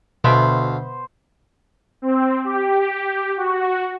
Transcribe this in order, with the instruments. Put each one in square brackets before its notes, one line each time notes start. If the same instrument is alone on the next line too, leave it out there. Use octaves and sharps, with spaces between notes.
[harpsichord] D2 F5 [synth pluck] B2 [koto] B3 E5 [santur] C5
[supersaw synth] C4
G4
F#4